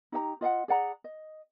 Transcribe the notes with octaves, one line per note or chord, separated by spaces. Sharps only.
D#4 G4 E5 A#5
F4 D#5 F5 F#5
G#4 D5 F#5 A#5
D#5